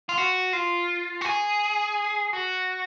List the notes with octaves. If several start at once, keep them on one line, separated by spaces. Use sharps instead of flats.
F4
F#4
F4
F#4
G#4
F#4